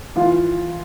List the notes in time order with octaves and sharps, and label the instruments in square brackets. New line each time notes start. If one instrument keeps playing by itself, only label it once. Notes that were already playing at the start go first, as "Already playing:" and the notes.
[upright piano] E3 F4